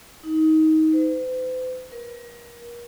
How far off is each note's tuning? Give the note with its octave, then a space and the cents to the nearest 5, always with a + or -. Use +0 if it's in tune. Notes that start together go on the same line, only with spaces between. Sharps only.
D#4 +20
C5 -45
A#4 +30